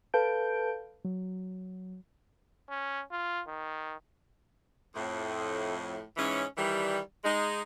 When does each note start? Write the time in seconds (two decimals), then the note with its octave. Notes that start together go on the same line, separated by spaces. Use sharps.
0.14 A4 B4 F5 A5 G6 D7
1.04 F#3
2.70 C#4
3.11 F4
3.47 D#3
4.95 F2 A2
6.17 G#2 E3 C#4
6.57 D#3 E3 G3
7.24 G#3 D#4